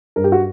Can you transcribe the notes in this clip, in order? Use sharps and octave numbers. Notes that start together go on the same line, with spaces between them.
G2 A#4
G4
F#4